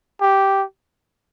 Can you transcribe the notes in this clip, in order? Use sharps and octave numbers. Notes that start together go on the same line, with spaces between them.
G4